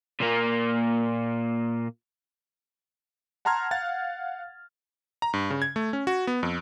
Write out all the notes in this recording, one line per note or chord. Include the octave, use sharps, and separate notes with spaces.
A#2 A#3
F#5 A5 A#5 C6 F6 G#6
F5 F#5 A6
A#5
G2
C#3
G#6
A3
C#4
F#4
B3
F2